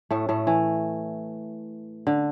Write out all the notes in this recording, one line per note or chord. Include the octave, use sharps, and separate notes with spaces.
A2 A3
A2 A3
E3
D3